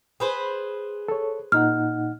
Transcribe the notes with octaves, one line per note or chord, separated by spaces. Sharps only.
G#4 B4 C5
A4 C#5
A#2 D#4 F#5 F6